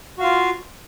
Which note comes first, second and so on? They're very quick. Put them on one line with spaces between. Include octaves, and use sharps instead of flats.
F#4 F5 F4